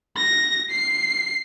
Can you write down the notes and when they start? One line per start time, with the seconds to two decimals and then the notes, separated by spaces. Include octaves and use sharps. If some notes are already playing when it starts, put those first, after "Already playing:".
0.17 A#6
0.71 C7